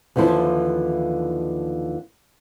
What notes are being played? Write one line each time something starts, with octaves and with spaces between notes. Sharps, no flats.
D#2 D3 E3 F3 E4 C5